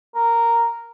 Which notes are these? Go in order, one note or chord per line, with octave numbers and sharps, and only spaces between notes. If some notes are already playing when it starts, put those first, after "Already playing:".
A#4